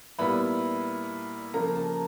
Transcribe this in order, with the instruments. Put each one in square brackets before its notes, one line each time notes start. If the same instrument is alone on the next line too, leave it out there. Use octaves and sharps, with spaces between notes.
[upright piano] A#2 G3 B3 E4 B5
C#3 F3 A#3 A#5
A5